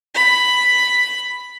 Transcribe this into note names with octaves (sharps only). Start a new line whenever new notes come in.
B5